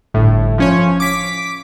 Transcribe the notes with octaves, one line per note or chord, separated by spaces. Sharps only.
G1 A2
F3 C#4 C#5
D6 B6 D7